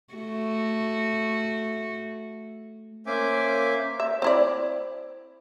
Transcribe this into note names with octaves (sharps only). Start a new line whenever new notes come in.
A3 F#4
A#3 C#4 C5 E5 G#5 D6
E5
C4 E4 D5